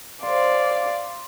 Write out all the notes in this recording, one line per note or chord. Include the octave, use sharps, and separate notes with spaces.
C5 D5 F5